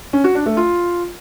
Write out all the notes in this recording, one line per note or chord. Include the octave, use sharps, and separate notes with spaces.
C#4
F#4
D4
A3
F4